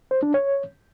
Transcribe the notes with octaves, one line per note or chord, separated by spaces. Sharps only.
C5
D4
C#5